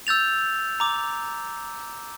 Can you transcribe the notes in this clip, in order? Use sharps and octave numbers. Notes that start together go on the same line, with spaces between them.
E6 G6 A6 F7
A#5 D6